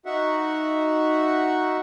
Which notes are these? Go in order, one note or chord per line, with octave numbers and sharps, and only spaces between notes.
D#4 F#4 E5 F#5